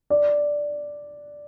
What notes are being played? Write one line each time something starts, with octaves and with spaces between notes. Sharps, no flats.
D5